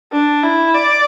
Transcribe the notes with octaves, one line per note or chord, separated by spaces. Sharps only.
D4
E4
D5